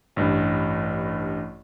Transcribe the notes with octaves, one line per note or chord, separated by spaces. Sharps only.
A1 G2